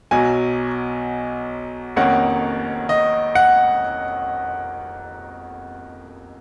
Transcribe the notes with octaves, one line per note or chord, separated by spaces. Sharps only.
B1 B2 F#3 G#5
F1 F2 D#3 A#3 C#4 F#5
D#5
F#5